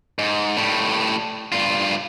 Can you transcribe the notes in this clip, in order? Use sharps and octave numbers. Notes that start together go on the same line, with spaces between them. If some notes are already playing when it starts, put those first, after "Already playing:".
G#2
A2 G3
G2 F4